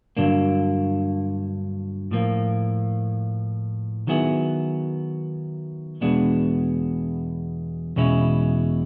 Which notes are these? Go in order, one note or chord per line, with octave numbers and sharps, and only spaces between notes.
G2 D3 F#3 A#3 D4
A2 F3 A#3
D#3 F#3 B3 E4 G#4
E2 B2 G#3 B3 D4
E2 B2 G#3 C#4 E4